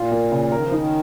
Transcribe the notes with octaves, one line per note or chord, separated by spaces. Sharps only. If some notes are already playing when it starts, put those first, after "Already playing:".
Already playing: A#2 F4
A#3
C#3
D#3 A#4
F3
D#3 D#4